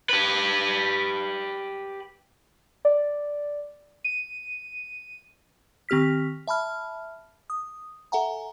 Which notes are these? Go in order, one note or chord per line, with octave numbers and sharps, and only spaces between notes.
G4 B4
D5
D#7
D#3 C4 G4 F6 B6
E5 A5 B5 F6
D#6
A4 E5 F#5 G#5 A#5